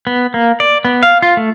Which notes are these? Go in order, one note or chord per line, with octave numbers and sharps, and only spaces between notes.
B3
A#3
D5
B3
F5
F4
A3